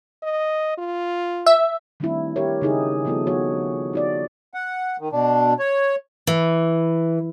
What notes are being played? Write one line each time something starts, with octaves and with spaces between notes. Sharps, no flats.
D#5
F4
E5
D#3 G3 A3 C4 D4 E4
G4 A#4 C#5
C#3 D#4 G#4
F3 G3 B3 E4 F4 A4
F3 B3 F#4 C#5
D#4 F#4 D5
F#5
D#3
B2 D4
C#5
E3